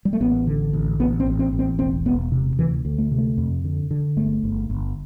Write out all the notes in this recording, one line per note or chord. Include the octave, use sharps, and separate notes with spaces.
G3
A3
A1 B3
D3
A1
A1 B3
C4
A1
C4
A1
C4
E1 C4
E1 B3
C3
D2 E3
D2
A3
C3
A3
F2
D3
D3
G1 A3
G1
G1